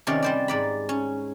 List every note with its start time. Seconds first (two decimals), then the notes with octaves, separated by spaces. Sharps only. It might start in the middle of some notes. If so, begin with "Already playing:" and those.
0.07 C3 D#3 C#4 D5
0.23 G3 C5 D5
0.48 G#2 D5 B5
0.89 C#4